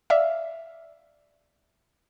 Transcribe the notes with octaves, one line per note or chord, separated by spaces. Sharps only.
D5 E5 F5